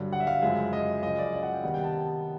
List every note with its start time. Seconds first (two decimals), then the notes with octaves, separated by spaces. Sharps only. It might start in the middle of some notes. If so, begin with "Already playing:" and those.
Already playing: G2 D3 F#3
0.13 F#5
0.20 E5
0.27 F5
0.42 F#2 C#3 F3 G#3 E5
0.73 D#5
1.03 F#2 C#3 F3 D#5
1.18 D5
1.34 D5
1.43 F#5
1.54 G5
1.64 C3 D#3 G3 B3 F#5
1.74 G5
1.84 A5